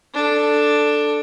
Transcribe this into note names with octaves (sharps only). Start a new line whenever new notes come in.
D4 A4